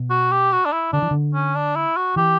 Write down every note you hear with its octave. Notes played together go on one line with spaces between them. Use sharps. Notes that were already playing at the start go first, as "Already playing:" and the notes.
Already playing: B2
F#4
G4
F#4
D4
E4
D3 D4
E3
D3
C#4
D4
E4
F#4
E3 G4